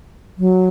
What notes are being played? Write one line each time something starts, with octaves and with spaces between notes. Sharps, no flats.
F#3